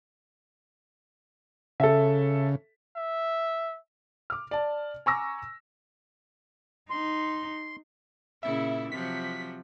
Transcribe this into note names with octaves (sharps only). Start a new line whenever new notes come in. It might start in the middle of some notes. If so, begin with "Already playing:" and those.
C#3 A4 E5
E5
D6 F6
D5 A5
G#5 A#5 C#6 D6 E6 A#6
D#4 C6
A#2 C#3 E4 E5
C3 F3 F#3 B6